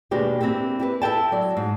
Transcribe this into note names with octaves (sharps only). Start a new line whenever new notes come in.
D#2 B2 G#3 D4 G4 C5
A#3 C4 D4 E4 G4
E4 G4 B4
E4 A4 G5 A5
F#3 D5
G#2